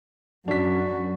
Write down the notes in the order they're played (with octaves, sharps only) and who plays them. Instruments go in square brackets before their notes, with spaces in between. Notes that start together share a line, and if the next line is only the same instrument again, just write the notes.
[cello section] F#2 [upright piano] D4 B6 [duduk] F#4